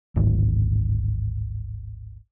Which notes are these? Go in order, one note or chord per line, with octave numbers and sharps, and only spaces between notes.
D1 G#1